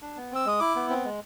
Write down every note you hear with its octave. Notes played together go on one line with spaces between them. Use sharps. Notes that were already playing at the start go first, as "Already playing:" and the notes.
D4
B3
C4 E6
G#3 D#6
E4 D6
B3
C4
G#3